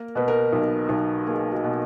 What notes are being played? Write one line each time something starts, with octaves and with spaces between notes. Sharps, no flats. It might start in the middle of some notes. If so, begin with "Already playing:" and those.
Already playing: A#3 A#4
B2 B4
A#4
B1
B1
A#3 G#4
F#4
B2